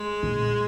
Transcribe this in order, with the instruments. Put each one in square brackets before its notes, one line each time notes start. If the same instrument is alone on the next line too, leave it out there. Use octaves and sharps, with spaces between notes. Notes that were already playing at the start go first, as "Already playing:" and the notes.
Already playing: [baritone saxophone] G#3
[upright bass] A#2